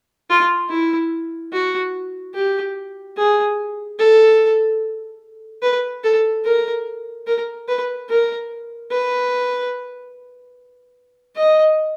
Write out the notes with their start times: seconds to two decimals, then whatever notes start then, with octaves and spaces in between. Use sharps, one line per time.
0.30 F4
0.70 E4
1.53 F#4
2.35 G4
3.17 G#4
3.99 A4
5.63 B4
6.04 A4
6.45 A#4
7.27 A#4
7.68 B4
8.09 A#4
8.91 B4
11.36 D#5